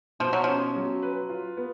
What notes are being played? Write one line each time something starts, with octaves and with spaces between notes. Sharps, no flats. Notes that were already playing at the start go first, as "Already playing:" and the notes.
B2 F3
F#3
F3 C#4
F#3
B4
F4
B3